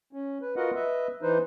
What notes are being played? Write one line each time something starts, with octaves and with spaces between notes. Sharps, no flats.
C#4
B4
F4 F#4 A#4 B4 D#5 F#5
B4 D#5 E5
E3 D#4 B4 C5